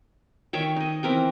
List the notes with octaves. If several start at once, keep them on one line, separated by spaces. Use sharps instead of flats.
D#3 C#5 E5 G5
D#4 D#5
E3 C4 A#4 G5